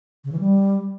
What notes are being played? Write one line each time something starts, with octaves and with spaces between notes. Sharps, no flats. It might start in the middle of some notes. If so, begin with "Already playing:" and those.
C#3
E3
G3